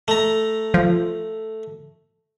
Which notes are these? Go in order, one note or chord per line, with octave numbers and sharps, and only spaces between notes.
A3 A#5
F3